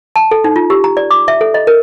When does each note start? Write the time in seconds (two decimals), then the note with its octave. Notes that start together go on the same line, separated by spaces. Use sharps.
0.16 A5
0.31 A4
0.44 D#4
0.56 F4
0.70 G4
0.84 A#5
0.97 D5
1.11 D6
1.28 E5
1.41 A4
1.54 D#5
1.67 A#4